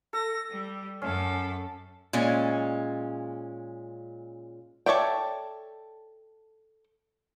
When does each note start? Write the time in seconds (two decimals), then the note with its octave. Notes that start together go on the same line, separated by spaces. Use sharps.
0.13 A4 A#6
0.50 G3
1.02 F#2 C#4 A4
2.13 A#2 G#3 C#4
4.86 A4 C#5 D5 E5 G5